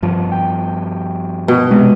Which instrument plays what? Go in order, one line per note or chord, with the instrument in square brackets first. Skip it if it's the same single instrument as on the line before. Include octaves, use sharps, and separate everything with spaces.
[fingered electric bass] G2 F3
[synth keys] G5
[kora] B2
[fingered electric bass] C3 [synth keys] G#3